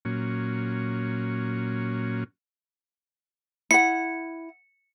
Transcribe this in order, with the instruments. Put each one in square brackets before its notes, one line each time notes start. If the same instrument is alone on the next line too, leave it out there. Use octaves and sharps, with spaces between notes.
[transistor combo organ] A#2 F#3 C#4
[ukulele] E4 F#5 [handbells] C#7